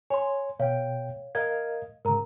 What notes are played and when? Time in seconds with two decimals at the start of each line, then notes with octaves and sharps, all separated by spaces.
0.10 C#5 G#5 C6
0.59 B2 C#5 F5 G5
1.35 A#4 D#5 F5 G#6
2.05 G#2 C#3 A#4 A#5